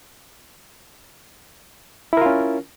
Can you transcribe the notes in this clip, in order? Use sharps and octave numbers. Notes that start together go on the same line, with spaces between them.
C#4 E4 F4 A#4